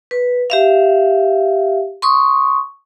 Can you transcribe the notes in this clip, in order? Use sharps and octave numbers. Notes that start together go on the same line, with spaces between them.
B4
G4 E5 F5
C6 C#6 D#6